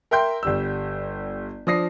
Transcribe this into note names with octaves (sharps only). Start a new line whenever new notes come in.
A#4 E5 G5 C6 G6
G1 G3 E6
F3 D4 D#6 A#6 C7